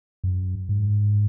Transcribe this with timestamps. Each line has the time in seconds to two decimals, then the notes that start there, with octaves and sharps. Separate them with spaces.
0.24 F#2
0.69 G#2